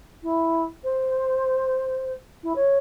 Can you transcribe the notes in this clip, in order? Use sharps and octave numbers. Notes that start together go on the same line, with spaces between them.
E4
C5
E4
C#5